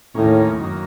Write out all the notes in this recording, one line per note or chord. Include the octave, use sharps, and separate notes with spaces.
D#2 A2 D#3 A#3 C#4
F#2 D#3 A#3